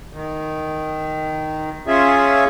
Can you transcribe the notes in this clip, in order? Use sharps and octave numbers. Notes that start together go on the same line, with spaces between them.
D#3
C#4 F4 G#4 E5